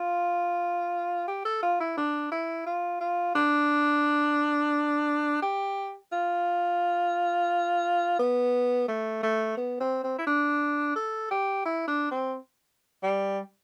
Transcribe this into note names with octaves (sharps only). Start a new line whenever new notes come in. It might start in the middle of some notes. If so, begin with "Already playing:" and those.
Already playing: F4
G4
A4
F4
E4
D4
E4
F4
F4
D4
G4
F4
B3
A3
A3
B3
C4
C4
E4
D4
A4
G4
E4
D4
C4
G3